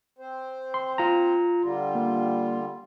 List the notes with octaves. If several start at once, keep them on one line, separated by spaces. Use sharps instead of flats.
C4 C5
C6
F4 A#5
D3 G3 F4
A#3